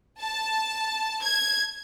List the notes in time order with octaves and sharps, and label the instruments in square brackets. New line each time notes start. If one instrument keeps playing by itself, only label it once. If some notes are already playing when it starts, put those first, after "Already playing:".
[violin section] A5
G#6